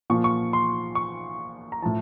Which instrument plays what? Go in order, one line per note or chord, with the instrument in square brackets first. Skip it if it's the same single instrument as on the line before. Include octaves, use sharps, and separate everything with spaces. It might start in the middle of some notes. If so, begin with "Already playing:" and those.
[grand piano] A#2 F3 C#6
C#6
C6
C#6
A#5
A2 F3 A5